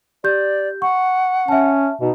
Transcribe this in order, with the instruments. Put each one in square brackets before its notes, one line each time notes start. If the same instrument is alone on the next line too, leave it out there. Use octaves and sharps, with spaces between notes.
[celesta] G4 G6 [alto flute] D5
[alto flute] F#5 [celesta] C#6
[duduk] C#4 [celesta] E5 A5
[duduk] B2 [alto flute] D#4